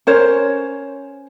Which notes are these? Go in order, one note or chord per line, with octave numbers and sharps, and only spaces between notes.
C#4 A#4 C5 C#5